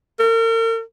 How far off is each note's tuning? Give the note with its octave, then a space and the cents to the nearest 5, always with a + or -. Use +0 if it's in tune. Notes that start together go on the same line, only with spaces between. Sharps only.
A#4 -40